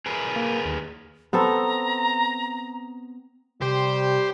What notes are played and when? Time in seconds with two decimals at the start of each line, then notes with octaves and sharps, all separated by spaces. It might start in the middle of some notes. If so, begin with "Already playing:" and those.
0.06 G#4 A#4 B4
0.36 A#3
0.65 D#2
1.33 B3 C4 A4 A#5
3.62 C3 G3 G4 C5